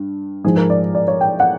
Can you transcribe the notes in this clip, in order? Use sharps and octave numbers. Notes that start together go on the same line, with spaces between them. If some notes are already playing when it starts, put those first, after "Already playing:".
Already playing: G2
G#2 F3 G#4
A#4
D5
D5
C#5
G5
F#5